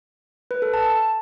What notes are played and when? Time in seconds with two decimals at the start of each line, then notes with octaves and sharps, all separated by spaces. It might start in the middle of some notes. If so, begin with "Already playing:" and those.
0.51 B4
0.62 A4
0.74 A5